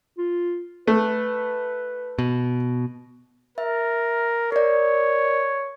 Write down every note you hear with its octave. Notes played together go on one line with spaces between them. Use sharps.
F4
A3 B4
B2
A#4 E5
A#4 C#5 D5